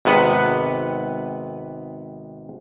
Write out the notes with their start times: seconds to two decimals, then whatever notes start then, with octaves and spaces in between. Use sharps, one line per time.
0.05 G#1 C3 B3 B4 F#5